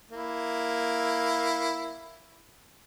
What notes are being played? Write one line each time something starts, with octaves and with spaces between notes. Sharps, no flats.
A#3 E4